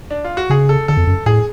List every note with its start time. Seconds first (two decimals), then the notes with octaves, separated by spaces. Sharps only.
0.11 D4
0.24 F4
0.37 F#4
0.50 C#3 G#4
0.69 A4
0.88 D3 A4
0.97 F2
1.07 F#2
1.26 A2 G#4